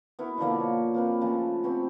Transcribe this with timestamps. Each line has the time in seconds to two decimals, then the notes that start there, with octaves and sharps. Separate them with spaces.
0.19 B3 E4 F#4 A#4
0.38 B2 D3 F3 A#3
0.60 C#5
0.94 A#3 C4 B4
1.21 C#3 F3 A3
1.63 B3 C4 F#4 G4